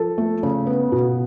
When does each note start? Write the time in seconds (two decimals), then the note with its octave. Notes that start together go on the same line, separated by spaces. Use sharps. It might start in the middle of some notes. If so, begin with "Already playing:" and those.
Already playing: F3 A4
0.18 A3
0.43 C#3
0.66 B3
0.92 B2